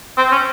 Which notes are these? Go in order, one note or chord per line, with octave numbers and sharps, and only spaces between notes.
C4
C#4